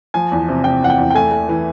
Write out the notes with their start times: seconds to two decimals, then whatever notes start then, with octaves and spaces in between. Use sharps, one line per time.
0.14 F3 G#5
0.32 E2
0.49 C3
0.64 C3 G5
0.82 E2 F#5
0.90 G5
0.98 E2
1.11 G5
1.14 A3 G#5
1.32 A3
1.49 E3